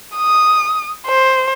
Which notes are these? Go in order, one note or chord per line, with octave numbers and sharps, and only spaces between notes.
D#6
C5